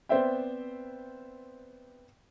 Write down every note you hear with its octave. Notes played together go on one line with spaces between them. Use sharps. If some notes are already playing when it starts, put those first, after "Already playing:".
B3 C4 C5 D5 E5 G5